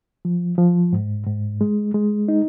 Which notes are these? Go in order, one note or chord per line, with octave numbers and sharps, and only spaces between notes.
F3
F3
G#2
G#2
G#3
G#3
D#4